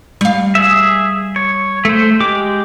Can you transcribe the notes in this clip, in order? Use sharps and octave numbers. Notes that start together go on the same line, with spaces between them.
G3 F5
G#4 E5
C#5
A3 C5
G#3 G4 D6